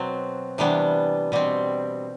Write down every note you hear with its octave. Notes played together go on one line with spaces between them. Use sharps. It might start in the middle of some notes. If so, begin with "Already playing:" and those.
Already playing: B2 F#3 C4
C3 E3 G3 B3 D4
B2 G3 C4